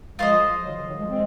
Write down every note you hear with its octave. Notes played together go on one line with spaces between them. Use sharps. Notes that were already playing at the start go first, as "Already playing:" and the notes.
F3 G#3 F4 C5 D#5
D#3 F#3
C#3 F3
D#3 F#3
F3 G#3
G#3 C4